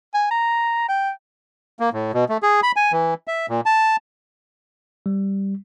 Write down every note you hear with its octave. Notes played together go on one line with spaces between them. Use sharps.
G#5
A#5
G5
A#3
A2
B2
A3
G#4
B5
G#5
E3
E5
A#2
A5
G3